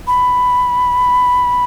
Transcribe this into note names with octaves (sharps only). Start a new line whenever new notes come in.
B5